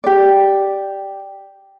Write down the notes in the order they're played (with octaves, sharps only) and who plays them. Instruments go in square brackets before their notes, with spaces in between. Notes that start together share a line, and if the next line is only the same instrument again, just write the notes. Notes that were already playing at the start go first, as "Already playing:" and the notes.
[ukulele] G4 D5